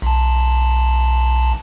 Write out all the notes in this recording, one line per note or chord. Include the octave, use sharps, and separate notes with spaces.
B1 A5